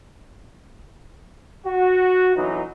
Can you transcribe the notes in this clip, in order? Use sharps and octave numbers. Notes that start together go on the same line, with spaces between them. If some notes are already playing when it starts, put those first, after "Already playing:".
F#4
G1 E3 F#3 D#4